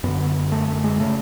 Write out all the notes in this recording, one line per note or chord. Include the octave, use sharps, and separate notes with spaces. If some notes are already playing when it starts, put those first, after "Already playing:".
F#2 D3 B3
A3
A3
G#3
C#3 A3